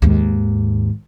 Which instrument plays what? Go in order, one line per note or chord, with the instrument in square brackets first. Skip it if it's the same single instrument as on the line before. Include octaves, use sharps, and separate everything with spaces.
[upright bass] D#2 G#2